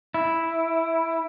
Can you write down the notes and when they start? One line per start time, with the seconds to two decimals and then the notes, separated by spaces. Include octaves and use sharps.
0.14 E4